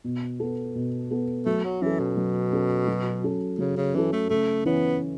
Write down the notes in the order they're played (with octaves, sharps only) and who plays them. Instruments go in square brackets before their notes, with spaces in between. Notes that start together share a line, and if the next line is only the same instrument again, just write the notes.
[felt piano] B2
B3 A4
B2
B3 A4
[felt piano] F#3 [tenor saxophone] A3
[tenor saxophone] F#3
[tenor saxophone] E3 [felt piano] C#4 A4
[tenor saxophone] B2
[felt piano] F#3
C#4 A4
F#3
C#4 A4
[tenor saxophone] C#3 [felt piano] F#3
[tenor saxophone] C#3
[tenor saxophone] E3 [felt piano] C#4 A4
[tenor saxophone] A3
[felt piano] C#3 [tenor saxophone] A3
[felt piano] E3 C#4 [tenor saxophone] B3